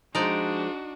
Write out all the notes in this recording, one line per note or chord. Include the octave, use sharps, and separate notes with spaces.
F3 G#3 D4 D#4 F#4 D5